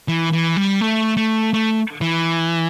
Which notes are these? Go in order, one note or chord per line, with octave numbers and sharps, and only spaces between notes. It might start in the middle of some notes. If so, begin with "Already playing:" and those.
E3
E3
G3
A3
A3
A3
E3